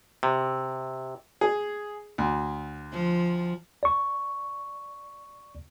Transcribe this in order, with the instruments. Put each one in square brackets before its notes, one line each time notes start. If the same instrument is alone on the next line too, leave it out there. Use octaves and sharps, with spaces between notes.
[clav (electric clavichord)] C3
[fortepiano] G#4
D2
[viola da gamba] F3
[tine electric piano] D5 C#6